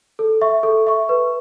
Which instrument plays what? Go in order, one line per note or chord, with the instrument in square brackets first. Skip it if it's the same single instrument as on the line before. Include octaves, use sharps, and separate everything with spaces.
[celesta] A4
E5 C#6
A4
E5 C#6
B4